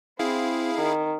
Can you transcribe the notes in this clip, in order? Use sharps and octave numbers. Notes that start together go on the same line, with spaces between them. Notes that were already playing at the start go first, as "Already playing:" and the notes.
C4 E4 G#4 F5
D#3